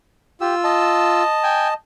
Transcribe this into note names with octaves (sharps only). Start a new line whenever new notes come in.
F4 G4 E6
D#5 A5
G5 G#5